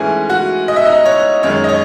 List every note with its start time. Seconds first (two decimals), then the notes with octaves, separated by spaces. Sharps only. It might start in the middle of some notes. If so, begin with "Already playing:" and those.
Already playing: G#2 E3 A3 C#4 G#4 G#5
0.29 F#4 F#5
0.68 D#5
0.76 E5
0.85 D#4 D#5
1.06 C#5
1.43 F#2 D#3 G#3 C#5
1.64 D#5
1.69 C#5